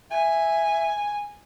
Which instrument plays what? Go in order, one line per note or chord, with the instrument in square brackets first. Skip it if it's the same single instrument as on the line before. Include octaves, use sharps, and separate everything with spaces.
[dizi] E5 [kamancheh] G#5